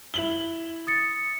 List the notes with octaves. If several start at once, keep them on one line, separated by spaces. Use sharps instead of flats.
E4 F#7 G7
D#6 A6 C#7